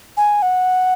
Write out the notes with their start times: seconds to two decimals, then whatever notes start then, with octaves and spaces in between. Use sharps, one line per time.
0.17 G#5
0.42 F#5